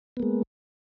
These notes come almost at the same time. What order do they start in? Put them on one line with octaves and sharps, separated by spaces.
B3 A#3 G#3